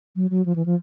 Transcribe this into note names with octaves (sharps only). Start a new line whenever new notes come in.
F#3
F#3
F3
E3
F3